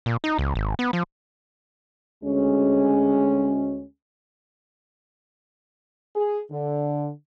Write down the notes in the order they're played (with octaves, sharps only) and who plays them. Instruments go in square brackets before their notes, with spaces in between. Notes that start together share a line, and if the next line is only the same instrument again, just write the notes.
[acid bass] A#2
D#4
C#2
G#1
B3
F3
[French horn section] D2 G#3 C#4
G#4
D3